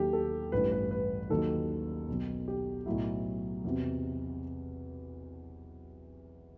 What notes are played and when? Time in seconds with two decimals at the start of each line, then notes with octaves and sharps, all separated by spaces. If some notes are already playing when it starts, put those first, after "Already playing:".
Already playing: D#2 D#3 F#3 G4 A4
0.13 A4
0.52 A1 G2 E3 B4
0.72 B4
0.91 B4
1.30 D#2 D#3 F#3 A4
2.08 B1 B2 F#3
2.48 G4
2.86 B1 A2 F#3 E4
3.64 E2 C3 F#3